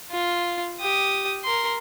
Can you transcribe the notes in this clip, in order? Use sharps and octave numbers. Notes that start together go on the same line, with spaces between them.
F4
G4 D#6
A#4 C6